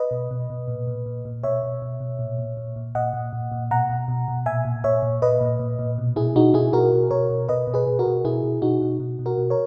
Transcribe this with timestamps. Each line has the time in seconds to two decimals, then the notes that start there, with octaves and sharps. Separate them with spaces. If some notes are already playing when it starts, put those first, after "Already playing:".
Already playing: B4 D#5
0.11 B2
0.31 B2
0.50 B2
0.68 A#2
0.87 A#2
1.06 A#2
1.25 A#2
1.43 B2 C#5 E5
1.63 B2
1.82 B2
2.00 B2
2.19 A#2
2.38 A#2
2.57 A#2
2.76 A#2
2.95 A#2 D#5 F#5
3.13 A#2
3.33 A#2
3.52 A#2
3.71 B2 F#5 A#5
3.90 B2
4.08 B2
4.28 B2
4.46 A#2 E5 G#5
4.65 A#2
4.84 A#2 C#5 E5
5.03 A#2
5.22 A#2 B4 D#5
5.41 A#2
5.59 A#2
5.79 A#2
5.98 B2
6.16 B2 E4 G#4
6.36 B2 D#4 F#4
6.54 B2 E4 G#4
6.73 B2 F#4 A#4
6.93 B2
7.11 B2 A#4 C#5
7.30 B2
7.49 B2 B4 D#5
7.67 B2
7.74 G#4 B4
7.87 B2
7.99 F#4 A#4
8.06 B2
8.25 B2 E4 G#4
8.44 B2
8.62 B2 D#4 F#4
8.81 B2
9.00 B2
9.19 B2
9.26 F#4 A#4
9.38 B2
9.50 A#4 C#5